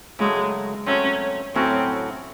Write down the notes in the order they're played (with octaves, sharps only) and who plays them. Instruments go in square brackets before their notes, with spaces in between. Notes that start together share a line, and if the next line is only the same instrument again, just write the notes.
[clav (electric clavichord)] C#3 F#3 A3 [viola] G#3
[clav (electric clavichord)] F#3 A3 C4 [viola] C#4
[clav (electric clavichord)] A2 F#3 C#4 F#4 [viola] C4